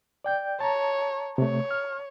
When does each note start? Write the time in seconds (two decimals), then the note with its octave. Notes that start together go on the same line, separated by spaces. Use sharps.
0.24 D5 G5 G6
0.60 C#5 A5 A#5
1.38 C3 A3 C#5
1.71 F6